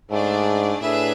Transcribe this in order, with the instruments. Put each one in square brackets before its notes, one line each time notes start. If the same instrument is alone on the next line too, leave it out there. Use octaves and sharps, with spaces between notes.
[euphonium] G#2 [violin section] A3 D4 G#4 D5
[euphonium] A2 [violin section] D4 G#4 B4 E5